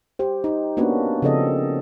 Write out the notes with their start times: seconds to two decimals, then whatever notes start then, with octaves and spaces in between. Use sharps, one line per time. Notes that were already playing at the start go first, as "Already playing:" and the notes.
0.19 G4 C5
0.44 D#4
0.77 A#3 B3 C#4 D4 F#4 B4
1.22 C#3 F3 C4 A4 D5 D#5